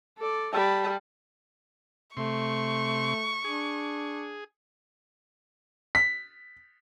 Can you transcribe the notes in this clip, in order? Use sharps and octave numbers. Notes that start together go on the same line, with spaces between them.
A4 D5
G3 A5 B5
C3 A3 C6 C#6
D4 G#4
B6